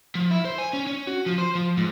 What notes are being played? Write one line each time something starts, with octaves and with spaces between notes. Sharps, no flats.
F3
E4
C5
G#5
C#4
C#4
F#4
F3
C5
F3
G#2